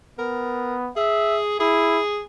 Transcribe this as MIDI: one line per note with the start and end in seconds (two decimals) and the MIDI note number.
0.19 0.90 59
0.19 0.75 70
0.96 1.59 68
0.96 1.41 76
1.60 2.00 64
1.60 2.20 68